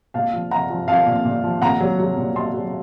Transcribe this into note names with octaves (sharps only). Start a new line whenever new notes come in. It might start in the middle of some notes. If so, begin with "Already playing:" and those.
A#2 F5 A5
F3
F3 F#5 A#5
F3
F3 F5 A5
A#2
A#2
F3
A#2 F#5 A#5
F#3
F#3
A#2
A#2 A5 C6
F#3